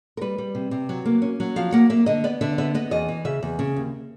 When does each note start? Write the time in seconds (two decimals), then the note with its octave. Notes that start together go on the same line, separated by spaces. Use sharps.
0.17 A#4
0.21 G3 B4
0.38 G3
0.55 C3
0.71 C3
0.89 F#3
1.05 A#3
1.22 C#4
1.40 F#3
1.56 F3 F5
1.72 A#3 F#5
1.90 A#3 E5
2.06 D3 D#5
2.24 B3 D5
2.41 D3 E5
2.58 B3 E5
2.75 B3 D#5
2.91 E2 D#5
3.08 E3
3.25 C#3 E5
3.43 E2
3.59 C#3
3.76 D#2